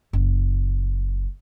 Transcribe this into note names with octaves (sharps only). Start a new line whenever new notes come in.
F#1